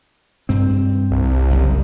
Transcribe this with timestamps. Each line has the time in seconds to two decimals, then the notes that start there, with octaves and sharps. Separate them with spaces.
0.49 G2 C4
1.11 C2
1.50 F#1